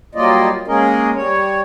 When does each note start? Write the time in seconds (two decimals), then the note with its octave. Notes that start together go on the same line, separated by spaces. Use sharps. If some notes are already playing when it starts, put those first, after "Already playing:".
0.15 F#3 G3 A#3 F4 D5 D#5
0.67 G#3 A#3 C#4 G#4 A#4 D#5
1.15 G3 C#5